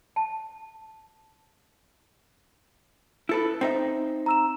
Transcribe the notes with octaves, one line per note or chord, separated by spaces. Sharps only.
A5
E4 A4 B4
C4 D#4 E5
A#5 E6 E7